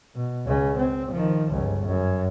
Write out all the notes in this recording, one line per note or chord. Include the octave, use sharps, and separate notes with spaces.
B2
C#2 C#3
C4
D#3 F3
G1 C#2
F#2